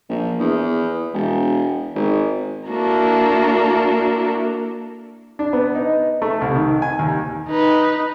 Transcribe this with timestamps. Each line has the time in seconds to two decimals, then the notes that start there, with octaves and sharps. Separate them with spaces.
0.10 A#1
0.40 E2
1.14 E1
1.95 G#1
2.70 A#3 D4 E4 F#4 A4 A#4
5.39 D4
5.53 B3
5.75 D#4
6.22 A3
6.41 C2
6.55 D#3
6.82 G#5
6.99 D#2
7.48 D#4 B4